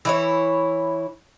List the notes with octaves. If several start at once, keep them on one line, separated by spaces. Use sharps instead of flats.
E3 E4 C#5